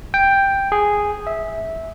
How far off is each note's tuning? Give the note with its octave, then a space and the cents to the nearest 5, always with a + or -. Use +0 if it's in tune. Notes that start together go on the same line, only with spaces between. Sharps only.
G5 +5
G#4 -5
E5 -15